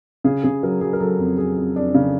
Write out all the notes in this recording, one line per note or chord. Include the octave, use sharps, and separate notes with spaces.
C#3 G#4
C#3 G#4
F#3 A#4
F#3 G#4
A#4
F#3 A4
F2
F#3 G#4
F2
F2 D4
C#3